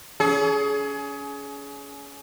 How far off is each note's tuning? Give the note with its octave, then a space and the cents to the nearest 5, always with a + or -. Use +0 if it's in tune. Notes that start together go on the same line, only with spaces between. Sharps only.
C#4 +30 G#4 +25